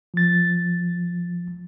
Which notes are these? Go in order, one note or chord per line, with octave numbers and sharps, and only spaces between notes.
F3 A6